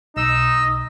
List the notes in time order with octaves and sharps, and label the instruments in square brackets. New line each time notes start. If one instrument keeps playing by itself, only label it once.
[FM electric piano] B1 [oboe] D#4 [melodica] D#5 [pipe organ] E6